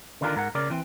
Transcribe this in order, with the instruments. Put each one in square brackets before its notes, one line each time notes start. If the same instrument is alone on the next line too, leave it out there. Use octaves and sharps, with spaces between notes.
[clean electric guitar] D3 D#3 D4 F4 G4 A#4
G#2 A#4 F#5
C#3 A#4 D5
E3 C4